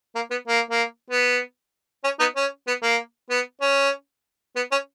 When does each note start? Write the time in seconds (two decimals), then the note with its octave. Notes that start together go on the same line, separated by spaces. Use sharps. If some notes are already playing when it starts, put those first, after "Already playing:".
0.15 A#3
0.31 B3
0.48 A#3
0.71 A#3
1.11 B3
2.04 C#4
2.19 B3 D#4
2.36 C#4
2.67 B3
2.82 A#3
3.30 B3
3.61 C#4
4.56 B3
4.71 C#4